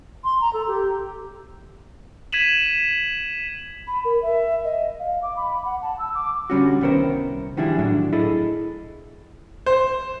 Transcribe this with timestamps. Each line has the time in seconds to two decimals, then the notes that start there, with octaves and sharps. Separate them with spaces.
0.24 C6
0.40 A#5
0.53 A4
0.67 G4
2.32 G#6 B6 D#7 E7 F#7
3.87 B5
4.05 A#4
4.22 E5
4.65 D#5
4.99 F5
5.23 D6
5.36 B5
5.65 F#5
5.82 A5
5.99 E6
6.15 D6
6.50 D3 G3 C#4 F#4
6.81 C2 D#3 B3 C#4 A#4 C5
7.57 D#3 F3 G3 D4 E4 G#4
7.79 A2 D3 F#3 D4
8.13 E4 G#4 A4 D#5
9.66 C5